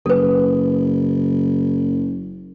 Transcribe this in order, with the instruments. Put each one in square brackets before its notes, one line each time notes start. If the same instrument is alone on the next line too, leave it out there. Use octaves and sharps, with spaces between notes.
[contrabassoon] F#1 [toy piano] A4 B4